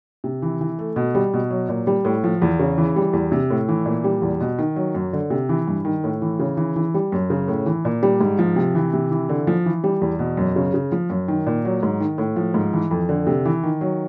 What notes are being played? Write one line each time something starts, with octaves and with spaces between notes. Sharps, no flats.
C3
E3
E3
A3
B2
G3
B2
F#3
A#2
G3
A2
F3
E2
C#3
E3
G3
E2
C3
A2
E3
A#2
G3
E2
B2
D#3
F#3
F#2
D3
C3
E3
G2
D#3
A2
E3
C#3
E3
E3
G3
F#2
C#3
A2
E3
A#2
G3
G#2
F3
C3
E3
C3
E3
D3
F3
E3
G3
E2
B2
F#2
C#3
C#3
F3
F#2
D#3
A#2
F#3
G#2
D#3
A2
F3
G#2
E3
F2
D3
C3
E3
D#3
F#3